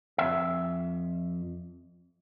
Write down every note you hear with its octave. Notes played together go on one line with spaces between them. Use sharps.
F2 E5